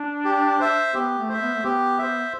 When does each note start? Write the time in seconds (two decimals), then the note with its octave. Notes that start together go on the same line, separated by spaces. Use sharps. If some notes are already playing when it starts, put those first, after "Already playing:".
Already playing: D4
0.25 G4
0.60 C5 E5
0.94 B3 G4
1.18 A3
1.29 C5 E5
1.41 B3
1.55 A3
1.63 B3 G4
1.98 C5 E5